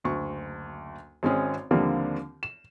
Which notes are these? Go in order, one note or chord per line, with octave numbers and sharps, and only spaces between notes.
F#1 D2 C#6
G#1 G#3 C4 C#4 G#4
D#2 D3 F3 G3 A#3 C4
E7